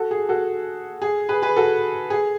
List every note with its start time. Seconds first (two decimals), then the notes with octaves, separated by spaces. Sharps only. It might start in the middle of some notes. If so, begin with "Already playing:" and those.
Already playing: F#4 A4
0.11 G#4
0.29 F#4 A4
1.02 G#4
1.29 G#4 B4
1.42 G#4 B4
1.56 F#4 A4
2.10 G#4